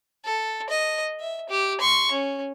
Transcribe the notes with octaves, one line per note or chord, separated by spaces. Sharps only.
A4
D#5
E5
G4
C6 C#6
C#4